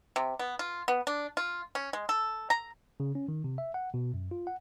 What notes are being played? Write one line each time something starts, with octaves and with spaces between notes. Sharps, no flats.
C3
B3
F4
B3
D4
F4
C#4
G#3
A4
A#5
C#3
C#4
D#3
C3
E5
F#5
B2
F#2
F4
F#5